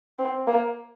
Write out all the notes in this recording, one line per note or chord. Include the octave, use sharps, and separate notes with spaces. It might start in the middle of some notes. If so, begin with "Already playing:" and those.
C4
A#3